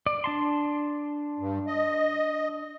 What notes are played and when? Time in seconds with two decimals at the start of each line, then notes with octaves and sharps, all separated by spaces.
0.06 D5
0.24 D4 A5 C6
1.39 G2
1.67 D#5